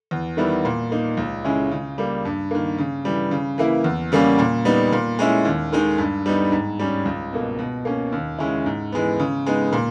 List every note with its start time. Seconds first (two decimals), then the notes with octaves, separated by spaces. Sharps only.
0.11 E2
0.37 D#3 G3 B3 E4
0.65 A#2
0.91 A#3 D#4
1.17 C#2
1.44 C#3 G#3 C#4 E4
1.71 C#3
1.98 G3 A#3
2.25 G2
2.51 D#3 A#3
2.78 C#3
3.05 E3 G3
3.31 C#3
3.58 E3 A#3 E4
3.84 E2
4.12 C#3 G3 A#3 C#4
4.39 A#2
4.65 G3 B3 D#4
4.92 A#2
5.19 G#3 C#4 E4
5.45 D#2
5.73 D#3 G#3 D#4
5.98 G2
6.26 G3 B3 D#4
6.52 G#2
6.79 G3 C#4
7.05 C#2
7.33 B2 A#3
7.59 B2
7.85 A#3 C#4
8.12 D#2
8.39 C#3 G#3 C#4 E4
8.66 G#2
8.92 E3 G#3 B3
9.19 C#3
9.46 G#3 B3 D#4
9.73 A#2